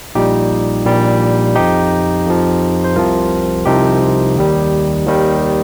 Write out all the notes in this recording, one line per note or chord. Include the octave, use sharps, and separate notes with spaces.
A#1 A#2 G3 D#4 G4
A#1 A#2 G3
F2 F3 D#4 G4
F2 F3
C5
C2 C3 F3 F4 A#4
C2 C3 F3 D#4 G4
D#2 D#3 G3
D#2 D#3 G3